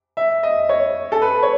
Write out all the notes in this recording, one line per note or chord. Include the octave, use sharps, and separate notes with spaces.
E5
D#5
C#5
A4
B4
C#5